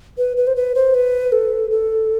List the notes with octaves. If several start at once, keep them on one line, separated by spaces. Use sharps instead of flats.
B4
B4
C5
B4
C5
B4
A4
A4